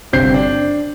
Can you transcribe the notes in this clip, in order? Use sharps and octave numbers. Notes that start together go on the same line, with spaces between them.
G1 C3 C5 G6 C7
D4